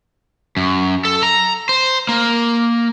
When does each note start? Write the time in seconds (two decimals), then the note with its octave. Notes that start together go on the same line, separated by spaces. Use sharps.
0.57 F#2
1.05 A4
1.23 A#5
1.69 C5
2.09 A#3